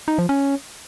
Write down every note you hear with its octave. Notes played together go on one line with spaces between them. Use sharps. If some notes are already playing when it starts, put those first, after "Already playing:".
D#4
F3
C#4